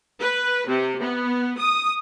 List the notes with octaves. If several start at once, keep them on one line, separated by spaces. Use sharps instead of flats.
B4
C3
B3
D#6